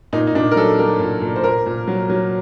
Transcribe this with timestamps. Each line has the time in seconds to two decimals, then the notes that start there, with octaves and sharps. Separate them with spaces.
0.13 A#2 D#4
0.27 D#4
0.35 A#2 D4
0.51 A#4
0.56 F#3 A4
0.79 F#3 A#4
1.00 A#2
1.22 A#2
1.36 C5
1.44 A#2 A#4
1.66 A#2
1.87 F#3
2.10 F#3